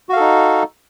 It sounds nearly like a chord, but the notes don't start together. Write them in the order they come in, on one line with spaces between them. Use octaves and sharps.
F#4 F5 A4 D#4